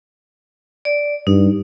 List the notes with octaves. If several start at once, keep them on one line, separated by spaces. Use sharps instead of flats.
D5
G2 D#4